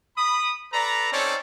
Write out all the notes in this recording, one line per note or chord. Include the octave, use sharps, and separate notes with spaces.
B5 D#6
A4 B4 D5 A#5
C4 C#4 D#4 A4 C#5 D5